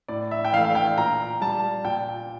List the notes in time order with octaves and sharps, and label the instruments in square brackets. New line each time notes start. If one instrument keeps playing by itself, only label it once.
[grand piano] A2 D5
E5
G5
E3 F5
A3
F5
G5
A#2 A#5
G3 A5
A#2 G5